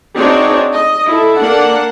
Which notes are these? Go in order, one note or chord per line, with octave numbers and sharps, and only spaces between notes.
C4 D4 D#4 F#4 G#4 C#5
D#5
E4 A4
A#3 D4 F#5